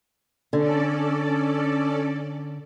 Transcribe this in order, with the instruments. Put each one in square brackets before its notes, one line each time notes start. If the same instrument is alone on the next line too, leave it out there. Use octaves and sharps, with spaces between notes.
[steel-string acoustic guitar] D3 [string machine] C#4 A4 D5